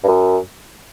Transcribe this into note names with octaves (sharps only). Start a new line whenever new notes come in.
G2
F#2